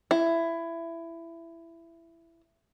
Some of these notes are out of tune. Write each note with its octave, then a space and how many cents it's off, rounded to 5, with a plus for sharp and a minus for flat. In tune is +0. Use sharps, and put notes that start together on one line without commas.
E4 +15